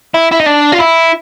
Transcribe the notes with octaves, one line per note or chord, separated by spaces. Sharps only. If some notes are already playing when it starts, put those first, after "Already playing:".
E4
E4
D#4
D4
F4
E4